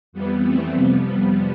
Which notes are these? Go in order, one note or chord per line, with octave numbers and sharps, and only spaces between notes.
F2 E3 G3 B3
A3 C4
F2 C3 F3 G3 B3